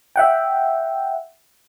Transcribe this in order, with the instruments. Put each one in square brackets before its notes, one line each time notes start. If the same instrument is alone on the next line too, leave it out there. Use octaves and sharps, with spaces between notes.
[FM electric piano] E5 F#5 G5